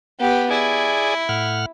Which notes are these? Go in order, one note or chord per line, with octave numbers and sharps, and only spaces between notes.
B3 G4
E4 G#4 D5 G#5
A2 F#5 F6